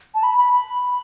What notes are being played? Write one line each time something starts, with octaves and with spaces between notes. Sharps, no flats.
A5
B5
B5
B5